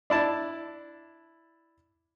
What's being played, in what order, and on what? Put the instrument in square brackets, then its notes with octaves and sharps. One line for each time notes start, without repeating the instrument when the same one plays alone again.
[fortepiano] D4 E4 A5